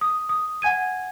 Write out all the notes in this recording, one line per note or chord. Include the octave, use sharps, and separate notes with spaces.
D#6
D#6
F#5 G#5 G#6 D#7